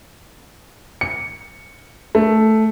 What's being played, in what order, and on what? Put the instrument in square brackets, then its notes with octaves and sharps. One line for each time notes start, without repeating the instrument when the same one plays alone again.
[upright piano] C#7
A3